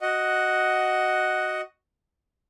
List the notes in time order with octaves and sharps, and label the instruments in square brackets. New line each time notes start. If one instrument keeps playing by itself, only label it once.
[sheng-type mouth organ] F#4 D#5 F#5